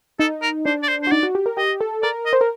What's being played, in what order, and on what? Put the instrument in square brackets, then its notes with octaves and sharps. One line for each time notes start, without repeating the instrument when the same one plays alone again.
[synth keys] D#4 [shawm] A4
[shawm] A#4
[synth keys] D4 [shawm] C5
[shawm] D5
C5
C5
[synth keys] F#4
[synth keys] D#4 [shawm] D5
[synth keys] F#4
G4
A#4
[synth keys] G4 [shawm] D#5
[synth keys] A4
[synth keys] A#4 [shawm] D5
[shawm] D#5
[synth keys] C5
A#4